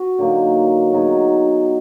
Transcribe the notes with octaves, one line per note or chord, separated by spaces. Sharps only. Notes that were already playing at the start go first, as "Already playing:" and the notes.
Already playing: F#4 B4
D3 F#3 A#3 D#4
F#3 B3 D#4 G#4